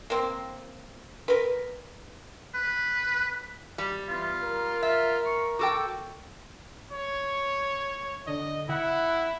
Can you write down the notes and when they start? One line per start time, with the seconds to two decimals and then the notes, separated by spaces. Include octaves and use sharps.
0.10 A#3 C4
1.28 A#4 B4
2.54 B4
3.78 G3
4.09 E3 B3 E4 F4
4.42 A#4
4.83 F4 E5
5.26 C#6
5.59 F#4 A4 G5 D6
6.92 C#5
8.27 D3 D#5
8.69 E4 F#5